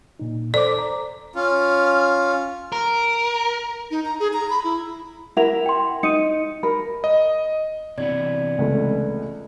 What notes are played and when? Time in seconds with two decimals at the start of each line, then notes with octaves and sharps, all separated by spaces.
0.20 A#2 D#4
0.54 A4 C5 D5 D6
0.78 A#5
1.35 C#4 F4
2.72 A#4
3.91 D#4
4.05 A#5
4.20 G#4
4.33 A#5
4.50 B5
4.64 E4
5.37 E4 A#4 F#5 F7
5.66 G5 C6
6.03 D#4 C#7 D#7
6.63 A#4 B5
7.04 D#5
7.98 C3 E3 B3 D5 G#6
8.59 C#2 A3